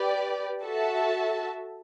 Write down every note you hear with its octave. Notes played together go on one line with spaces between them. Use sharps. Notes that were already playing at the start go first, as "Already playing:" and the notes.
Already playing: G4 B4 D5
F#4 A4 E5 A5